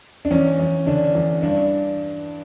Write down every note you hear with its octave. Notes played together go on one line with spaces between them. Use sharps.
D4
E2 C#4
E2
D3 D4
E2
G2 D4